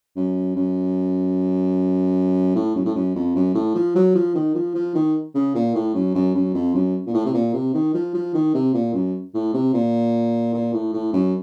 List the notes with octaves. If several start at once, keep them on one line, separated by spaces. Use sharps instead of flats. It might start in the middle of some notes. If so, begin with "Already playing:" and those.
F#2
F#2
A2
F#2
A2
F#2
F2
F#2
A2
F3
F#3
F3
D#3
F3
F3
D#3
C#3
A#2
A2
F#2
F#2
F#2
F2
F#2
A#2
A2
C3
A#2
C3
D#3
F3
F3
D#3
C3
A#2
F#2
A2
C3
A#2
A#2
A2
A2
F#2